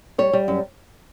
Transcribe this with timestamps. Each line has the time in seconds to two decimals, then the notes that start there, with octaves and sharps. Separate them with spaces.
0.18 G3 C#5
0.33 G3
0.48 F#2